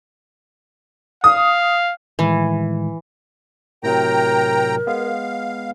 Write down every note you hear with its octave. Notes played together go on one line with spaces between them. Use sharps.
F5 D#6
A2 D#3 E3 G#3
A2 C3 F#3 A#4 G5 A#5
G#3 B3 F5